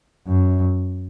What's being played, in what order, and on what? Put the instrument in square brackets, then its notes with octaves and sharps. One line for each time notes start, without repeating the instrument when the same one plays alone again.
[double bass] F#2